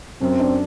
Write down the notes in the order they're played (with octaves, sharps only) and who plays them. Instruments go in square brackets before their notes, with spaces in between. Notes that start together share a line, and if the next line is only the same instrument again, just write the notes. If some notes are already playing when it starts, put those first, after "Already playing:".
[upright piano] F#2 [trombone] C4
[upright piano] D4